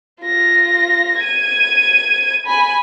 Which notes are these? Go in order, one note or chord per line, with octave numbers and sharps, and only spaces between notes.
F4 A#6
G#6 D#7
G#5 B5